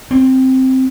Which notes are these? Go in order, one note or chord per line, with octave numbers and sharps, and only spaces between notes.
C4